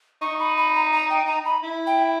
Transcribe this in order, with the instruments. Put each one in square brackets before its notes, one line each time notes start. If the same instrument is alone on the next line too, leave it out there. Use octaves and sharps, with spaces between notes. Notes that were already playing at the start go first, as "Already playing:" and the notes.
[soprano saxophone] D#4 [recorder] C#6
[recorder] B5
B5
A#5
A#5
G5
A#5
B5
[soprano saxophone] E4
[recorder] G5